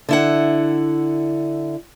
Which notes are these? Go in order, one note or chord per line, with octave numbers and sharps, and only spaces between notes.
D3 E4 F#5